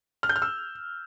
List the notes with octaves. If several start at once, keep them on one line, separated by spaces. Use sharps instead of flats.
F6
G6
F6
E6